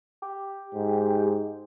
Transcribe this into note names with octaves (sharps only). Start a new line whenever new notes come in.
G4
G#2